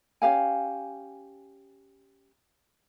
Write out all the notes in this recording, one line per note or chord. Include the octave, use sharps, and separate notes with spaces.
C#4 G4 F5 G#5